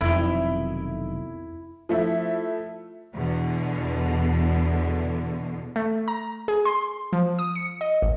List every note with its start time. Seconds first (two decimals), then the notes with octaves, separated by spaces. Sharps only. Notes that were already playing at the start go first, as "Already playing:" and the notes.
0.01 F1 B1 F2 D#3 E4
1.89 F3 A3 E4
3.14 E2 B2 D3
5.76 A3
6.08 A#5
6.48 G#4
6.65 C6
7.13 F3
7.39 D#6
7.55 C#7
7.81 D#5
8.02 A1